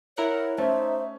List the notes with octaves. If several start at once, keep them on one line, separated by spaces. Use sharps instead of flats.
E4 A#4 C#5 F#5
A3 C#4 D#4 C5 E5